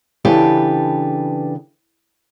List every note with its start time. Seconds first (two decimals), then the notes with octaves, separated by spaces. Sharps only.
0.25 C#3 E3 D4 G4 A4 B4